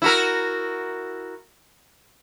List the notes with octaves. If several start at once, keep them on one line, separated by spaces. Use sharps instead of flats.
E4 F#4 A#4